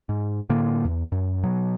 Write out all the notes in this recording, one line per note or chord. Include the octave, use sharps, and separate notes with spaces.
G#2
A2 D3 A#3
E2
F#2
B2 F#3